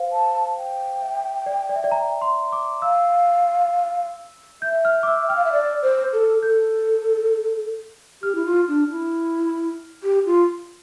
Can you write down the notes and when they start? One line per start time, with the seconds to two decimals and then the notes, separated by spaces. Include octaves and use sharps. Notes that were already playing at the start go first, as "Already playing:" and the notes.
Already playing: C5 F5
0.12 A5
0.57 G5
1.02 E5
1.46 D5
1.69 D5
1.76 E5
1.84 D5
1.92 A#5
2.22 C6
2.52 D6
2.82 F5 E6
4.62 E5 G6
4.85 F6
5.03 D6
5.08 E6
5.28 G5 F6
5.36 F5
5.45 E5
5.52 D5
5.82 C5
6.13 A4
6.43 A4 G6
8.23 G4 F6
8.35 E4
8.46 F4
8.53 F6
8.68 D4
8.91 E4
10.03 G4
10.26 F4